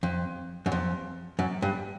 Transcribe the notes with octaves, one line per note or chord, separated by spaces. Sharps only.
F2
F#2
F2
F#2
G2